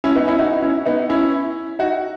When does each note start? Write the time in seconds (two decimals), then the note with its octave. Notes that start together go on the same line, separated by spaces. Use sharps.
0.04 C#4 E4
0.15 B3 D#4
0.28 C#4 E4
0.39 D#4 F#4
0.63 C#4 E4
0.86 B3 D#4
1.09 C#4 E4
1.79 D#4 F#4